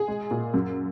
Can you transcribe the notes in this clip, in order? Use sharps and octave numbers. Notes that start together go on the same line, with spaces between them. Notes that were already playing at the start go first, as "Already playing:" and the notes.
Already playing: G#4
G#3
A#2
F#2